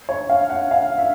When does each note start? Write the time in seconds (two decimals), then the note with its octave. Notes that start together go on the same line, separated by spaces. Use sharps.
0.09 C#5
0.29 F5
0.50 F#5
0.71 F5
0.98 E5